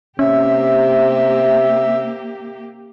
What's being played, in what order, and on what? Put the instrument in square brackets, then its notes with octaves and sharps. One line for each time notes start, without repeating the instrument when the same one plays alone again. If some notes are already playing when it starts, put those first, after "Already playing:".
[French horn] C3 [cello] A#3 G4 [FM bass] C#4 [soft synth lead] E5